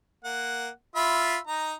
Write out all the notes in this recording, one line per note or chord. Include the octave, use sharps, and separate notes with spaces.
A#3 F#5
F4 E5 B5
D#4 A#5